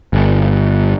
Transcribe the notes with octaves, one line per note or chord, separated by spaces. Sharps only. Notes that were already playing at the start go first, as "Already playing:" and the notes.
G1